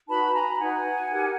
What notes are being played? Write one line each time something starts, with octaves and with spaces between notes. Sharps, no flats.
D#4 F#4 B4 A5 B5
G#5 A#5
D#4 F#4 B4 F#5 G#5
D#4 G4 A#4